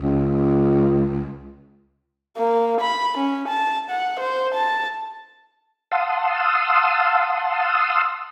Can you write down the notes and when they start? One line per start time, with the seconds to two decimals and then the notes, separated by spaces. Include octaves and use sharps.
0.01 C#2
2.37 A#3
2.81 B5
3.18 C#4
3.49 A5
3.90 F#5
4.20 C5
4.54 A5
5.91 F5 F#5 A5 C6 D#6 E6